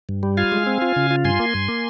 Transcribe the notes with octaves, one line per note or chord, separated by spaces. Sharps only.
G2
G3
F4 F5 G#5
G#3
C4
F4
C#3
F4
G2 G#5 C6
A#3
G2
A#3